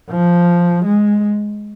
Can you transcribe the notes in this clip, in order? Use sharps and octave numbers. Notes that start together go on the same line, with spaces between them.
F3
G#3